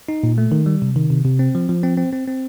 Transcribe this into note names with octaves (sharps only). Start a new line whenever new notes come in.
D#4
A#2
A3
D#3
G3
C3
D#3
C3
C3
C4
F3
F3
C4
C4
C4
C4